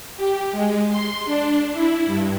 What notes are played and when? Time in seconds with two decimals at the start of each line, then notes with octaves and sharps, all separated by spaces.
0.17 G4
0.52 G#3
0.90 C6
1.25 D4
1.73 E4
2.06 G2